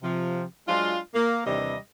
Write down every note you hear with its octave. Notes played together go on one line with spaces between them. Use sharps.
C3 F3
F#3 G#3 D4 F4
A#3
D#2 C3 E3 G3 D4 D#5